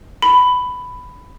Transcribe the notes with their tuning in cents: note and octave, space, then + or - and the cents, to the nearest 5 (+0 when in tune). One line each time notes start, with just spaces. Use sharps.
B5 +10